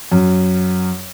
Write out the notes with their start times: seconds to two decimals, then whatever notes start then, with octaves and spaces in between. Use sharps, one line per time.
0.12 F#2